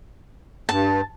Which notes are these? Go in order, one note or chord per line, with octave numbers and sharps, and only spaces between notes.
G2 A5